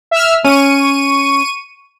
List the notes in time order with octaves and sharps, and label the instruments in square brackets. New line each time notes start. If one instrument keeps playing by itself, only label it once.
[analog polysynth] E5 E6 F6
[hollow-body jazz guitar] C#4 [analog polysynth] C#6 D#7